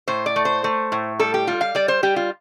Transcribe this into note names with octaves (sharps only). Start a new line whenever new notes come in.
A2 C5
D5
A3
C5
A3
A2
G3 A4
G4
G3 F4
F5
G3 D5
C5
G3 G4
F4